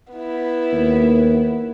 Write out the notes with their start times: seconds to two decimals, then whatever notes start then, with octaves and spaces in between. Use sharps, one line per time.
0.13 B3 E4
0.73 D#2